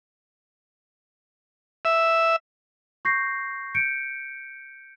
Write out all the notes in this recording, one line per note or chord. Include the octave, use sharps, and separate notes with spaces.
E5
C#6 G6 A#6 C7
G6 C#7 D7